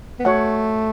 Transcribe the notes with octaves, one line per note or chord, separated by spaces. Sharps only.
B3
A3 F#4 C#5 F#5